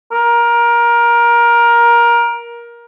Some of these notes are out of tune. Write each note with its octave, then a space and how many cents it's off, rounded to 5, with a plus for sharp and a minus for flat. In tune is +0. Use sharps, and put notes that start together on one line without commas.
A#4 +20